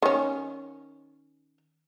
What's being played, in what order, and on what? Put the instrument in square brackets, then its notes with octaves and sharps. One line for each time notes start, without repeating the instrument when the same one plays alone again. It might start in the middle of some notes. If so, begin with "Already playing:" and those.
[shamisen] D#3 C#4